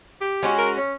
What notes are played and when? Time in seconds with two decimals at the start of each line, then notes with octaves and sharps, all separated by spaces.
0.21 G4
0.43 G#3 C#4 F#4
0.58 A#4
0.78 C#4